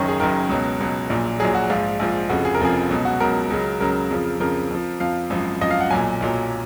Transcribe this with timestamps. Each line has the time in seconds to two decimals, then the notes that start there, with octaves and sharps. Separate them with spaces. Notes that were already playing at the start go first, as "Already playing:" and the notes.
Already playing: F#1 F#2 D#3 C#5
0.08 G#4
0.20 F#1 F#2 D#3 A#4
0.49 C#2 B2 F#3
0.80 C#2 B2 F#3
1.10 A#1 A#2 F#3
1.40 A#1 A#2 F#3 G#4
1.55 F#4
1.70 A#1 G#2 F3 F4
1.99 A#1 G#2 F3
2.29 F1 F2 C#3 F3 F#4
2.45 G#4
2.55 A#4
2.60 F1 F2 C#3 F3 G#4
2.90 C#2 B2 F#3
3.05 F#4
3.20 C#2 B2 F#3 A#4
3.50 C#2 C#3 F#3
3.80 C#2 C#3 F#3 A#4
4.11 F2 C#3 F3
4.40 F2 C#3 F3 A#4
4.71 F2 F3
5.00 F2 F3 F5
5.30 G#1 F#2 F3
5.61 G#1 F#2 F3 D#5
5.71 F5
5.81 F#5
5.90 B1 A#2 F#3 G#5
6.20 B1 A#2 F#3